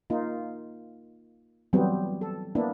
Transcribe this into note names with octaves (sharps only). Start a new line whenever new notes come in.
A#3 D#4 F4
E3 F#3 G3 B3 C4
A4
A#3 B3 D4 E4